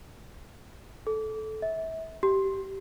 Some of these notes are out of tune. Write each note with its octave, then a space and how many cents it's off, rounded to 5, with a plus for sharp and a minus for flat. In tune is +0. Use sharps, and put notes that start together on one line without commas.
A4 -15
E5 -30
G4 -15